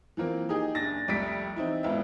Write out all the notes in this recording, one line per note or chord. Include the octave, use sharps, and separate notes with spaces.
E3 F3 A#3 C4
D#4 G4 G#4 G#5
F#1 D4 A6 A#6
C2 F2 G3 A3 B6 D7
E3 C4 D#4 E4
D#1 G#1 B3 E4 F4 E5